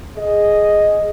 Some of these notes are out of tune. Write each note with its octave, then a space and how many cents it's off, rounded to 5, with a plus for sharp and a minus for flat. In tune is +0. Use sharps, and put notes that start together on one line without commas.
G#4 +0 D#5 +0